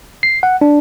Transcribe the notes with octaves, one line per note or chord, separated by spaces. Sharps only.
C7
F#5
D4